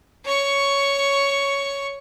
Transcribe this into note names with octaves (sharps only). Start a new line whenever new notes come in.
C#5 C#6